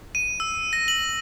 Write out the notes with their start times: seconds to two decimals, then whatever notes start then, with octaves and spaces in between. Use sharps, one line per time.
0.15 D#7
0.40 E6
0.73 A#6
0.88 F#7